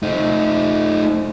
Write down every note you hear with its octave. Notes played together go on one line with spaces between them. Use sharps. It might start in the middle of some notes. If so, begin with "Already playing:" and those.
A3 D#4